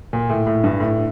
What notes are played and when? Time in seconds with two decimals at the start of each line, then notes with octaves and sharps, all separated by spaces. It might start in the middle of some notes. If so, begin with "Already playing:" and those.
0.13 A#2
0.29 A2
0.47 A2
0.64 G2
0.80 A2